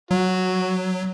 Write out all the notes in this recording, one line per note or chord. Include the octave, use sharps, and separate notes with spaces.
F#3 F#4